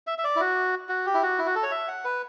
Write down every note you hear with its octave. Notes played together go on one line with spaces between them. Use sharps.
E5
E5
D5
E4
F#4
F#4
G4
E4
F#4
E4
F#4
A4
C#5
E5
F#5
B4